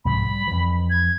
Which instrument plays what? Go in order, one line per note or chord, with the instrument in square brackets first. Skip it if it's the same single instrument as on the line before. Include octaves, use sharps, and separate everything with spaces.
[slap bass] C2 G#2 F3 [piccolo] B5
[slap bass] G3
F2 E3
[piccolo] G#6